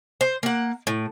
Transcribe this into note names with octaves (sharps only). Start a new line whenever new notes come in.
C5
A#3 F#5
A2